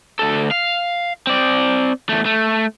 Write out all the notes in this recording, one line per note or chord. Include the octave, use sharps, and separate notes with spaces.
D2 A4
F5
C4 D5
E2 A3
A3